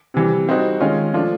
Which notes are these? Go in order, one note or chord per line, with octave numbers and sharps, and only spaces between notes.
C3 E3 G3
G3 C4 D#4 F#4
D#3 G#3 C#4 F4
F3 A3 D4 F4